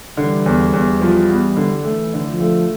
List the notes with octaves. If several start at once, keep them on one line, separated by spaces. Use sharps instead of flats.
D3 E3 G3
E2
E2
F3
B3
D3
E3 A3
D3
F3
A3